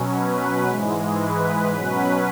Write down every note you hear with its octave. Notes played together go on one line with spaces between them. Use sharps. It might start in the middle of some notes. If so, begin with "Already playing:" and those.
Already playing: B2 F#3 C#4
B4
G#2 E3 G#3
B4
B2 F#3 C#4 B4